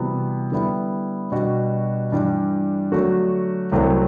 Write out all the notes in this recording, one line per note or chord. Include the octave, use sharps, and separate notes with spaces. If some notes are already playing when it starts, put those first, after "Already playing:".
Already playing: C3 E3 G3 B3 F#4
D3 G3 B3 E4
B2 G3 D4 F#4
G2 E3 G3 D4
D3 F#3 A3 D4 F#4
C2 C3 F#3 A3 C4